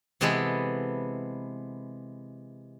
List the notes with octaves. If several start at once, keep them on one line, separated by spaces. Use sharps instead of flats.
C3 E3 G#3 B3 A4